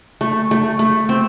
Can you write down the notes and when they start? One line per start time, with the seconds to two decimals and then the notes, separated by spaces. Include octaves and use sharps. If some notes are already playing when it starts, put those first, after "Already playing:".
0.21 A3
0.51 A3
0.79 A3
1.09 C4